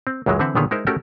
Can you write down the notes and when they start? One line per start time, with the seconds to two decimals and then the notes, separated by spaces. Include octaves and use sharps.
0.07 C4
0.26 C#2 F#2 E3 F#3 G#3
0.39 D3 E3 C4 E5 F#5
0.55 A#2 D3 D#3 B3 G#4 C#5
0.71 G#3 D#4 E4 A#4 C5
0.87 A3 C#4 F#4 G4 A4 A#4